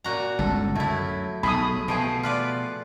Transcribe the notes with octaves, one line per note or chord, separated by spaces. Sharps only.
A#2 F#4 A#5
G1 C#2 A4
F#2 A3 E4
B1 A3 G#4 B5 D#6
B2 F3 A3 G#4
F4 B4 D5